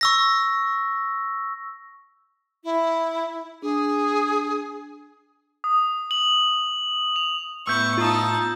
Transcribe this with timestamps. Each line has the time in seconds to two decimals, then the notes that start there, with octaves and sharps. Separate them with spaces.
0.01 C#6 E6 A#6
2.64 E4
3.62 D4 G#4
5.64 D#6
6.11 F#7
7.16 F7
7.67 A2 B3 E4 C#6 E6 G6
7.98 D#4 F4 A5 D#6